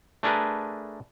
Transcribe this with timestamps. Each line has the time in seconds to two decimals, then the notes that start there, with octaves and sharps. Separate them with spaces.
0.23 A3 D4 G#4 A#4 B4